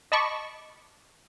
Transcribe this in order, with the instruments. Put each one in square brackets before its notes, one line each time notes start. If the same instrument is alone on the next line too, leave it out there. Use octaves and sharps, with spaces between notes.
[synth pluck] D#5 A5 B5 C#6 D6